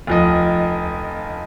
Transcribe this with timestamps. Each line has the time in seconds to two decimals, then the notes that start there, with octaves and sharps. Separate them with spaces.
0.07 F1 D2 F3 D#5